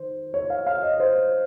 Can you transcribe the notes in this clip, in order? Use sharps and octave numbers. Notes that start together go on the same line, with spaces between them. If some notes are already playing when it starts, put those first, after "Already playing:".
Already playing: D#3 C5
C#5
F5
F5
D#5
C5